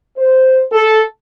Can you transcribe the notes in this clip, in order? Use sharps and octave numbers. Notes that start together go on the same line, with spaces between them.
C5
A4